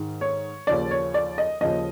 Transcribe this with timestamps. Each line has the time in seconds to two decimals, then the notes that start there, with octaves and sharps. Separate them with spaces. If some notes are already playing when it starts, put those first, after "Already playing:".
Already playing: G#2 D#3
0.21 C#5
0.67 D#2 C#3 F3 D5
0.91 C#5
1.14 D5
1.38 D#5
1.61 D#2 C#3 F3 D#5